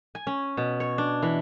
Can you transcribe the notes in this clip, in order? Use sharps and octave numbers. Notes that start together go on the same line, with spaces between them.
G#5
C#4
B2
C#5
D4
E3